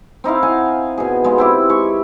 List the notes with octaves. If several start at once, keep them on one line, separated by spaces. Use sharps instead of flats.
C4 D#4 E4 F5
F5 F#5 G#5
B2 G#4
G#3 B3 F4
C4 E4 G4
G#3 G4 C#6